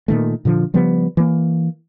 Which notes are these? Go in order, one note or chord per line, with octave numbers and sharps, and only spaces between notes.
A#2 D#3 A3
A#2 D3 F3
C#3 F3 G3 B3
E3 A#3